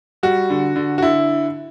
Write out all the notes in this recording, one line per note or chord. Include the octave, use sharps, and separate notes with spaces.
G3 F#4
D3
D3
F#4
D3 E4